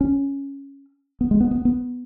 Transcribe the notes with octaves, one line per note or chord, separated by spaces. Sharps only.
C#4
B3
G#3
B3
B3
B3